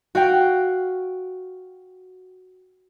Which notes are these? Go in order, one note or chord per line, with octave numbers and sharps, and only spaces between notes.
F#4 F5 G5